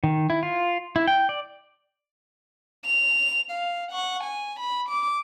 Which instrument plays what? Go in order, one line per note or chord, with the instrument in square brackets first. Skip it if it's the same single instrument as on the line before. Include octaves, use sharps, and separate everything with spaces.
[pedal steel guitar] D#3
E4
F4
E4
G5
D5
[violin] F7
F5
F#5 C#6
G#5
B5
D6